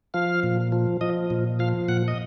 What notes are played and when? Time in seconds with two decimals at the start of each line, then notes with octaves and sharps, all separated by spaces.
0.14 F3 F5
0.44 A#2
0.72 F3
1.01 F3 D#5
1.30 A#2
1.59 F3 F5
1.88 A#2 F#5
2.08 D#5